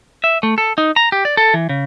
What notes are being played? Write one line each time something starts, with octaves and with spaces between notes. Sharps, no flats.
E5
A3
A4
D#4
A#5
G4
D5
A4
E3
C#3